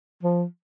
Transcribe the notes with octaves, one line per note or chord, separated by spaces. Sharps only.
F3